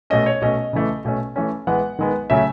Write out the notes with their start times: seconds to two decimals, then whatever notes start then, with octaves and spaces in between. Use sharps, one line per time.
0.10 B2 A3 C#4 D#5
0.26 C#5
0.42 B2 A3 C#4 D#5
0.73 C#3 E3 A3
1.05 B2 A3 C#4
1.36 E3 A3 C#4
1.67 E3 G#3 B3 F#5
1.99 D#3 G#3 B3
2.30 C#3 F#3 A3 C#4 E5